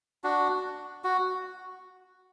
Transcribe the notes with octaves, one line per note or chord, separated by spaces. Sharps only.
D4 F#4
F#4